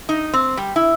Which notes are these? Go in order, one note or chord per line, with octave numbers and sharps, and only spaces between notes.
D#4
C4
G3
E4